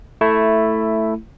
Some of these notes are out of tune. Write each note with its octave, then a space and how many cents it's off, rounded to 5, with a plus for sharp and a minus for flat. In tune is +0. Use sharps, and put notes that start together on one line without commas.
A3 +5 E4 +0